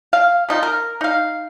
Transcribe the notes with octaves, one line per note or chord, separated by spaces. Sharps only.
F5
C3 D#4 F4
A#4
D#4 F5